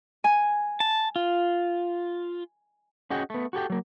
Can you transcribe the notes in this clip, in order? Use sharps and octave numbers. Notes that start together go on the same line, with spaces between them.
G#5
A5
F4
C#4 F#4 G#4 D#5 F#5 G5
A3 B3
F#4 G4 A4 G5
F#3 A#3